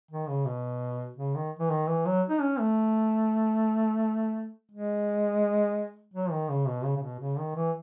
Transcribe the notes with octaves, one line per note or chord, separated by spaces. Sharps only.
D#3
C#3
B2
C#3
D#3
E3
D#3
E3
F#3
D#4
C#4
A3
G#3
F#3
D#3
C#3
B2
C#3
C#3
B2
C#3
D#3
E3